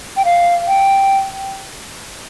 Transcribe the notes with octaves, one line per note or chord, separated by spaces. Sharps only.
G5
F5
G5